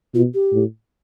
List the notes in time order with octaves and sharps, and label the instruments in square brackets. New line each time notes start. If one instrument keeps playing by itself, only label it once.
[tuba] B2 [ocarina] F4
[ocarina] G4
[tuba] A2